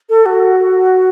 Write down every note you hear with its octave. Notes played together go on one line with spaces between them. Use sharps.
A4
F#4